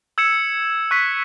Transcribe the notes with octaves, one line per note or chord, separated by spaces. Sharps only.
E6 G#6 C#7 E7
C#6 F#6 B6